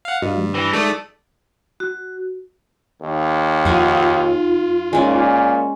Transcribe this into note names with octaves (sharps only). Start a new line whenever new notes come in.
F5 F#5
G2 F#4 D#5 F5
F3 G#3
E3 A#6
G#3 A3 D#4 G#4 A4 D5 D#6
F#4
D#2
F2 D#4 F4 F5 F#5 G#5
A#2 G#3 C#4 D5